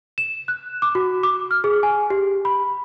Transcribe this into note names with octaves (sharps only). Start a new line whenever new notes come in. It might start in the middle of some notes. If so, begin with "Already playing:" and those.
E7
F#6
D6
F#4
D6
F6
G#4
G#5
G4
B5